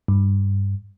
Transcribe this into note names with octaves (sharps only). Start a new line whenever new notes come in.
G2